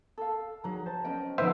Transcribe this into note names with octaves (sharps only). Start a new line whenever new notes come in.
A4 F5
F#3 D#4 G#4 A#5
C5 A5
C#4 D#5 G5
F3 B3 D#4 A#4 C5 E5 G5